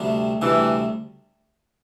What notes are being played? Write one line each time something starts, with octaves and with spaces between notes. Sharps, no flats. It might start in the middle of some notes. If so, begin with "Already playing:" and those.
Already playing: D2 C3 G3 D4
D2 C3 E3 G3 D4